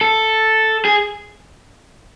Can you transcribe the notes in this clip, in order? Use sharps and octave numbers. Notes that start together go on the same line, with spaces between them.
A4
G#4